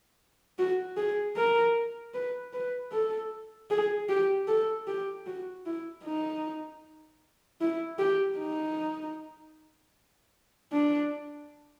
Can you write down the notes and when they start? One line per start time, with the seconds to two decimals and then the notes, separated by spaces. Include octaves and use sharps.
0.58 F#4
0.97 G#4
1.37 A#4
2.14 B4
2.53 B4
2.92 A4
3.71 G#4
4.09 G4
4.48 A4
4.87 G4
5.26 F#4
5.66 E4
6.04 D#4
7.61 E4
7.99 G4
8.38 D#4
10.73 D4